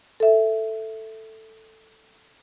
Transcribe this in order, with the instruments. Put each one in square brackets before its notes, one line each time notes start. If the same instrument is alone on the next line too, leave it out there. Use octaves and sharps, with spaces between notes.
[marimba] A4 E5